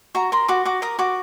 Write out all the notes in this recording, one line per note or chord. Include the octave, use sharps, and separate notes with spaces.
F#4 A#5
A#4 C6
F#4 D6
F#4 D6
A#4 D#6
F#4 D6